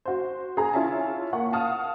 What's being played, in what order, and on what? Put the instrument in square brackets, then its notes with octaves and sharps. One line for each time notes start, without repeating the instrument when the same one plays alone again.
[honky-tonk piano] F#4 C5
G#4 A#5
E4 F4 C#5 E5 G#5 A5
A#3 F#5 C#6
F5 F#5 A5 D#6 F6